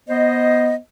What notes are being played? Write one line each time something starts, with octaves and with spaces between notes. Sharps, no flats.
B3 C5 D#5